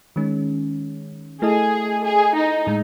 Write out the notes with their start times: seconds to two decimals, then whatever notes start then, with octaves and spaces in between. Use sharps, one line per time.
0.16 D#3 G#3 C#4
1.42 A3 E4 G#4 A4 D#5
2.04 G#4
2.35 D#4
2.67 A2 G#3